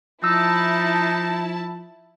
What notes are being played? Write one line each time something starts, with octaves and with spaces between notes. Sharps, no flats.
F3 D#4 E4 A5 E6